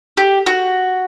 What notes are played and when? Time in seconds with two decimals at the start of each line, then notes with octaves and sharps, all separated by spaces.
0.17 G4
0.46 F#4